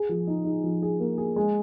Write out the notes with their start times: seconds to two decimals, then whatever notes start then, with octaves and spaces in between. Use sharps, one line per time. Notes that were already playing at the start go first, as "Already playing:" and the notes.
Already playing: G#4
0.09 F3
0.27 D#4
0.45 D#4
0.64 F3
0.82 G#4
1.00 A#3
1.18 G#4
1.36 G#3